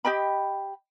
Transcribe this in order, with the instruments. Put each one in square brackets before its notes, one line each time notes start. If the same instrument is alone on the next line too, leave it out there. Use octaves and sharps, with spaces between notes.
[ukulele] G4 D#5 G5 B5